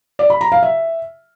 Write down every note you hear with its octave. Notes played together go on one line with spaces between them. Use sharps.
D5
B5
A#5
F5
E5